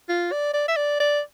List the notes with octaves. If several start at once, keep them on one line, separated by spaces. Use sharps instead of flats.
F4
D5
D5
E5
D5
D5